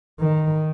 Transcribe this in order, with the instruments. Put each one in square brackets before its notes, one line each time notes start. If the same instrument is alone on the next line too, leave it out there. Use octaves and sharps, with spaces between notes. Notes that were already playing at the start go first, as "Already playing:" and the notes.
[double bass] D#3